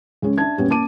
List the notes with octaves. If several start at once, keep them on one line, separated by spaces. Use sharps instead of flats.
C#2 G#3 C#4
D4 E5 A5 G#6
F#2 A#2 G3 B3 C#4
A#3 C#4 A5 D6 D#7